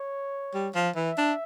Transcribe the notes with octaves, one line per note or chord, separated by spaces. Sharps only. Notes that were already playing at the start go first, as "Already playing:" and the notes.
Already playing: C#5
G3
F3
E3 E5
D4